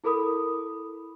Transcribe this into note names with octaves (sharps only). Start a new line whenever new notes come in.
E4 A4 A#4 B5 D#6